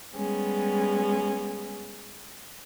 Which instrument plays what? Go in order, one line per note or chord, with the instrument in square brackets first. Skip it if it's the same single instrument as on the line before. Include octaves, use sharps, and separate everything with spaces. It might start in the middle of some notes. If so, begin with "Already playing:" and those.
[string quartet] G3 G#3 B3 C#4